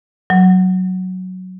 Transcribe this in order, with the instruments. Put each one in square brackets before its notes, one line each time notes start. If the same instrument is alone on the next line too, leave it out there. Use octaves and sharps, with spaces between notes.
[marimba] F#3